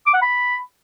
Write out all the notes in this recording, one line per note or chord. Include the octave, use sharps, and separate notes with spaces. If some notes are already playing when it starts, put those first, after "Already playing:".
D6
F#5
B5